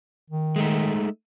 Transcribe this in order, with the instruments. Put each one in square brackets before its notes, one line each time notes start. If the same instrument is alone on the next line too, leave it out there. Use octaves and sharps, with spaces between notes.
[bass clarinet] D#3
[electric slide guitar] G#3 A3 D#4